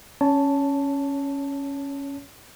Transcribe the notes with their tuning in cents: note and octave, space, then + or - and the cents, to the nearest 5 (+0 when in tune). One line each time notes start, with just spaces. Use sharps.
C#4 +0 C#5 +25 A5 +0